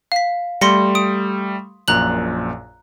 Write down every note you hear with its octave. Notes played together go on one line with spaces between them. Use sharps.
F5 B6
G3 A3 C6 A#6 C#7
D#6 D7
A#1 F#2 A#2 A#5 F#6 F#7